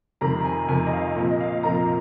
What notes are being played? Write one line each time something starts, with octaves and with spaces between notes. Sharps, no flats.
F2 C3 D#3 G3 A#5
A#5
G#5
F2 C3 D#3 G3 G#5
D#5
F5
A#2 F3 C4 D#5
D#5
F5
A#2 F3 C4 A#5